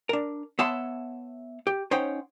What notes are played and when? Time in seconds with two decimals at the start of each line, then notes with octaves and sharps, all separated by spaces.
0.09 D4 A#4
0.59 B3 C#5 E5 F#5 A5 C6
1.67 G4
1.91 C#4 D#4 C5 C#5 F#5 G5